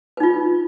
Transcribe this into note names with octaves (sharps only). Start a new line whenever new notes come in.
D#4 F4 B4